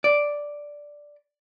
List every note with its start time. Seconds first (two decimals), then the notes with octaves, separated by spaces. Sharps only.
0.04 D5